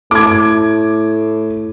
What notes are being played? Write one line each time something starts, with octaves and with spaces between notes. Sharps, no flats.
A2 D6 G#6